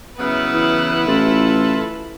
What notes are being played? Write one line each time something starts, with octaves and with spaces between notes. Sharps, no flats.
C#3 F#3 B3 E4 B4
E3
A1 F4 A4